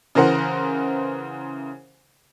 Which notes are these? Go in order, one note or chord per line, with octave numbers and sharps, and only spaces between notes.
C#3 E3 A#4 C5 F#5